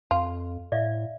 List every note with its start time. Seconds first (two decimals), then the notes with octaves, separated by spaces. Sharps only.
0.11 F2 F4
0.72 A2 D5 E5 F5